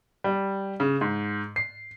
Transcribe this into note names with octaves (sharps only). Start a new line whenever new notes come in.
G3
C#3
G#2
C7